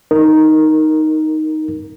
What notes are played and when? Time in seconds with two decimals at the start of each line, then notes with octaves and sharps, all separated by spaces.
0.11 D#4 A#4